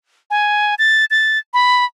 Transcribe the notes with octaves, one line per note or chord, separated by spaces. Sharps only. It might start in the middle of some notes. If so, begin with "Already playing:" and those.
G#5
A6
A6
B5